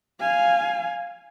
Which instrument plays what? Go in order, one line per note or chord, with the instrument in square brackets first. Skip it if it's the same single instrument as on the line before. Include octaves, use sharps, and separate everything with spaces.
[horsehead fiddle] F5 G#5